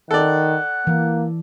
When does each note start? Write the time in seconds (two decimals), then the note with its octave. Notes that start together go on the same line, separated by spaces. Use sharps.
0.11 D#3 A4 D5 F#5
0.87 E3 A#3